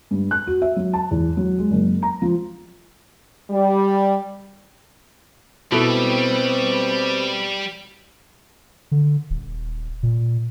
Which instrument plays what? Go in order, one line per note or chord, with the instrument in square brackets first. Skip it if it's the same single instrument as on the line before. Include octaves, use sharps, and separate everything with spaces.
[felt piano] G2
F#6
F#4
E5
F#3
A5
E2
F#3
G#3
F#1
A#5
F3
[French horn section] G3
[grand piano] B2 E4 A4 [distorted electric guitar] G3 [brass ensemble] C4 B4
[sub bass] D3
D#1
A#2